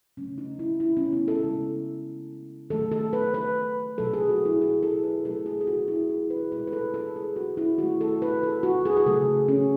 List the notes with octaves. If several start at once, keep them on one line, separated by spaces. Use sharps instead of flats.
C#3 F#3 A3 C#4
D#4
E4
E4
C#4
B3
A4
C#3 G#3
D#3 F#3 A3 A4
A4
B4
B4
B2 F#3 A3 A4
G#4
F#4
E4
G#4
A4
B4
B2 F#3 A3 A4
G#4
G#4
F#4
E4
G#4
B4
B2 G#3 B4
B4
A4
A4
G#4
F#4
E4
D#3 A3 F#4
A4
B4
A4
F#4
G#4
G#4
C#3 F#3 A3 A4
C#4